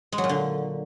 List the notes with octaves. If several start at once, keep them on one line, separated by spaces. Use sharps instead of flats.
G#3
F#3
A#2
D3